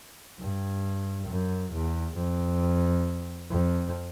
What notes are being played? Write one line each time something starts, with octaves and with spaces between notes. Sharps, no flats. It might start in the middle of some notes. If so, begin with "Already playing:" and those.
G2
F#2
E2
F2
F2